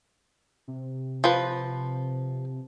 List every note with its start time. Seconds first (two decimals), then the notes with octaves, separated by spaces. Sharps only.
0.68 C3
1.24 F3 B4